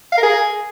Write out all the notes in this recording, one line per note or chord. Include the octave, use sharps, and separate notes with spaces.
F5
A#4
G#4